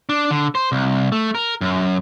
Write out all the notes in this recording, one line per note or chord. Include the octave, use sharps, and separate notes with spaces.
D4
D3
C5
C2
A3
A#4
F#2